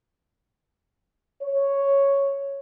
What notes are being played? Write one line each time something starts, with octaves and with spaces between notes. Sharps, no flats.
C#5